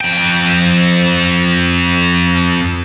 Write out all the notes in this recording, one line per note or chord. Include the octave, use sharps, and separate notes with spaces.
F2 G5